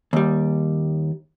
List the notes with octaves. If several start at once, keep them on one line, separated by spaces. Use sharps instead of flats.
D#2 G3